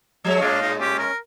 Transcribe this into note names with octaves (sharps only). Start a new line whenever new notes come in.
F3 G#3 C#5
A2 G#3 D4 D#5 F5
D#4
C#4 G4
A#4